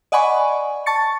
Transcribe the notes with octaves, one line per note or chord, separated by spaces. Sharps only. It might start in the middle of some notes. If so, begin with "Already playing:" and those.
D5 D#5 F#5 G#5 B5 C#6
A5 C#6 A6 C#7